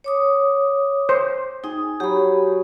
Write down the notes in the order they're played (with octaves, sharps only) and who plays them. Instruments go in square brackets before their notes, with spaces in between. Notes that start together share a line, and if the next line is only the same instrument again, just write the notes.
[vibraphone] C#5 D6 D#6
[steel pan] C5
[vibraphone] D#4 [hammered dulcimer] G#4
[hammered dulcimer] F#3 [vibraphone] G4 B5